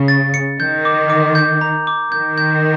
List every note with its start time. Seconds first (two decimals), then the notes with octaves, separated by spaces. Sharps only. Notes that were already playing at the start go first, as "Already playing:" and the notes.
Already playing: C#3
0.08 A6
0.34 C#7
0.60 D#3 G6
0.85 D6
1.10 D6
1.35 G6
1.61 A#5
1.87 D6
2.12 D#3 G6
2.38 G6